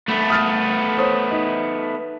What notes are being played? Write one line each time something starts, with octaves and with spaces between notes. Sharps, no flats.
A3 B3
D#6 F6 A6
C5 C#5 D#6
D#4